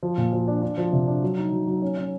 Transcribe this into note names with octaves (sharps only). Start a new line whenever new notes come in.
F3
A#2
F3
D4
D4
F3
C3
D4
F#3
D#4
F#3
F#3
C#4
C#4